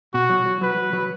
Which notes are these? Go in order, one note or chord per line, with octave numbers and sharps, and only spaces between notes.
B2 F#4
F#3
F#3
F#3 B4
F#3
F#3